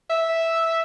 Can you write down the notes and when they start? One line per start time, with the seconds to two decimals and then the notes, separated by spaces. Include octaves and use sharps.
0.10 E5